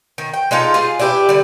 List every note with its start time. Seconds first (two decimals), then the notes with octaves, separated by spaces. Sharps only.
0.18 D#3
0.33 G5
0.51 G#3 D#4 F4 A4
0.74 F4 G#4
0.99 D4 E4 G4 B4
1.29 D3 G3